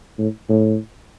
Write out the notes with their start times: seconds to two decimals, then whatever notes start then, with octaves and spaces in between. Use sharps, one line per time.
0.18 A2
0.49 A2